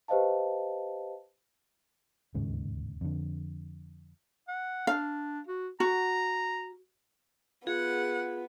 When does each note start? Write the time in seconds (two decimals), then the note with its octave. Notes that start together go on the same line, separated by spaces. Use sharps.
0.08 G4 B4 C5 D#5 F5 A5
2.35 D1 D#2 G#2 C#3
3.01 F2 D3
4.48 F#5
4.87 D4 F5
5.48 F#4
5.80 F#4 A#5
7.67 B3 F4 G#4 F#5